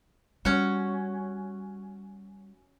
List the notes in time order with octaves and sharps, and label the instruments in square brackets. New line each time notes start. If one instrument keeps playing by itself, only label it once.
[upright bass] G3 [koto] C#4 F#4